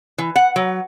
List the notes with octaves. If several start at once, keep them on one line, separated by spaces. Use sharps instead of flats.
E3
F#5
F#3